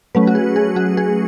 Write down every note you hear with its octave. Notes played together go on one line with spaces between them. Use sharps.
F#3 A3 C#4 B4
F#4
G#4
G#4
F#4
G#4